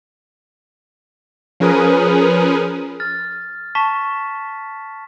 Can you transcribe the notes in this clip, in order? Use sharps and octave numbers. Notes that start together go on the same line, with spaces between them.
F3 C#4 G#4 A#4 B4 D#6
F6 A6
A5 C#6 B6 E7